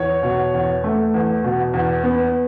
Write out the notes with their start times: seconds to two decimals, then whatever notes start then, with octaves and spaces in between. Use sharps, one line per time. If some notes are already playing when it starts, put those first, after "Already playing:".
Already playing: E2 C#5
0.23 B2
0.53 E2
0.84 A3
1.14 E2
1.44 B2
1.73 E2
2.03 B3